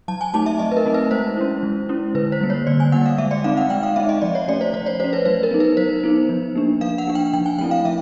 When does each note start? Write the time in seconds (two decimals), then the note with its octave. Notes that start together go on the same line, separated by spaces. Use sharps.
0.08 F#3 A5
0.21 G#5
0.34 A3 C4 D#4 A5
0.46 E5
0.59 F#3 D#5
0.72 B4
0.77 A#4
0.86 A3 C4 D#4
0.94 B4
1.11 G#3 C5
1.37 C#4 E4
1.63 G#3
1.89 C#4 E4
2.15 D3 B4
2.32 C5
2.40 G3 A#3
2.50 C#5
2.67 D3 D5
2.80 G#5
2.92 G3 A#3 F#5
3.06 F5
3.18 G#3 E5
3.31 D5
3.44 C4 D#4 F5
3.57 F#5
3.70 G#3 G5
3.83 F5
3.96 C4 D#4 E5
4.09 D#5
4.22 F3 D5
4.35 C#5
4.48 A3 C#4 D5
4.61 C5
4.74 F3 C5
4.86 C#5
5.00 A3 C#4 C5
5.13 B4
5.25 F#3 B4
5.43 A#4
5.51 B3 D#4
5.60 B4
5.77 F#3 C5
6.04 B3 D#4
6.29 F3
6.55 A#3 D4
6.81 F3 F5
6.98 F#5
7.07 A#3 D4
7.15 G5
7.34 F3 G5
7.46 G#5
7.58 A3 G5
7.61 C4 E4
7.71 F5
7.85 F3 E5